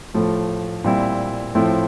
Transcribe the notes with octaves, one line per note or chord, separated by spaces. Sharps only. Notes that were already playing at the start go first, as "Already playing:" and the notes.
A2 F3 A3
A#2 G3 C4 E4
A2 F3 C4 E4